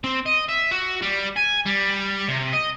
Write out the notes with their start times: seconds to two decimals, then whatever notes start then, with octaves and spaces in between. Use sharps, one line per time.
0.04 C4
0.26 D#5
0.49 E5
0.71 F#4
1.02 G3
1.37 G#5
1.66 G3
2.28 C3
2.53 D#5